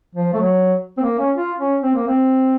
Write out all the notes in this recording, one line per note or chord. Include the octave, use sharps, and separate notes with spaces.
F3
A3
F#3
C4
A#3
C#4
F4
C#4
C4
A#3
C4